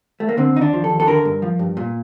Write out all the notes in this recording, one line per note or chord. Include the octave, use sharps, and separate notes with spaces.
A3
A#3
D3 C4
D#2 D#4
D4
F3
A4
D#2
A4
D3 A#4
G2
F3
G2
A#2